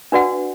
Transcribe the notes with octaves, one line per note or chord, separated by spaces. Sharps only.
D4 F#4 B4 D5 F#5